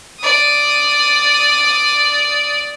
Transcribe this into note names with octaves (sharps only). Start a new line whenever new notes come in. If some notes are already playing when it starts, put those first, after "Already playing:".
D5 D#6